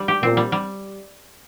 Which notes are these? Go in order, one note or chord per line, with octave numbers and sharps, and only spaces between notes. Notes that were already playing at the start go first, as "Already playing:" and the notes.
Already playing: G3
G4
A#2 C4
G3
G3